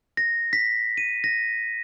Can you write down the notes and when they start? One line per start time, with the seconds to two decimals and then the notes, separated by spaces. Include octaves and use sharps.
0.17 A#6
0.53 B6
0.97 D#7
1.24 A#6